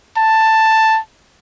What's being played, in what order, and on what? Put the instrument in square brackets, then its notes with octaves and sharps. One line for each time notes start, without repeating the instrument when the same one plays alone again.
[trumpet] A5